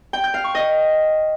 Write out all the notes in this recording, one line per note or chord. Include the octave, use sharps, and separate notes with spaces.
G5
G6
F5
C#6
D#5